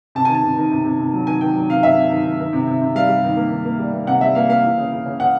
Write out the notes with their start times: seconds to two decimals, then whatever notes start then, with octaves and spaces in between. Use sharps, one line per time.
0.15 C3 A5
0.25 D#3 G#5
0.35 A5
0.44 C3
0.58 D#3
0.71 C3
0.85 C3
0.99 C3
1.13 F#3
1.27 D#3 G#5
1.41 D#3 G5
1.55 F#3
1.70 C3 F5
1.83 C3 E5
1.98 C3
2.11 D#3
2.25 D#3
2.40 D#3
2.53 C3
2.67 C3
2.82 C3
2.95 G3 F5
3.09 G3
3.24 D#3
3.37 A#3
3.51 D#3
3.65 A#3
3.79 G3
3.93 A#3
4.07 C3 F#5
4.21 G3 E5
4.35 A#3 F5
4.49 A#3 F5
4.63 E3
4.77 C#3
4.92 C#3
5.06 C#3
5.19 C#3 F#5